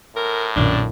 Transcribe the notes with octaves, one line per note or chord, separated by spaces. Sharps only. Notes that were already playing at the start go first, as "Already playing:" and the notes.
A2 A#4
B1 F#2 A#2 D#3 D4